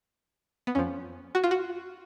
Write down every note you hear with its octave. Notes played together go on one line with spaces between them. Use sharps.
B3
F2 F3 C#4
F#4
F4
F#4